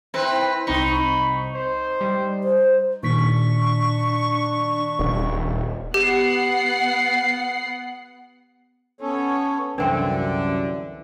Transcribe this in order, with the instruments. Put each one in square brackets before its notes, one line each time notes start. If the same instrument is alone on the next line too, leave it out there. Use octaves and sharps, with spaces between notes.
[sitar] C4 B4 [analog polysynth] E4
[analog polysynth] C2 C4 C#6 [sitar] D#4 [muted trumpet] B5
[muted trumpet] C5
[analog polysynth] G3
[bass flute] C5
[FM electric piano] A#2 D#3 B6 [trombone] D4 [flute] C#6
[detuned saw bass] D#1
[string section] B3 F#5 C7 [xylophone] G4
[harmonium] B3 A4 C#5 [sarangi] C#4
[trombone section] C2 F#2 [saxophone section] D3 [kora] E3 C4 [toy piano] D4 G5 C6